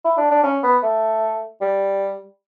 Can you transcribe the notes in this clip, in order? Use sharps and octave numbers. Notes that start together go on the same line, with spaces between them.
E4
D4
D4
C#4
B3
A3
G3